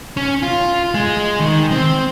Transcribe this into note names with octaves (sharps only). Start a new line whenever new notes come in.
C#4
F4
G#3
D#3
C4